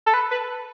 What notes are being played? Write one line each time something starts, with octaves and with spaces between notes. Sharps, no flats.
A4
B4
B4